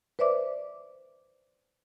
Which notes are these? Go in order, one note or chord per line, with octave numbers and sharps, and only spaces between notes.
B4 C5 D5 E5 D6